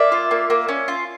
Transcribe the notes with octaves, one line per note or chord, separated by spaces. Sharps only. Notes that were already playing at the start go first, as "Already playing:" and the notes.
Already playing: A#3 D5 E5
F4
A#3
A#3
C#4
F4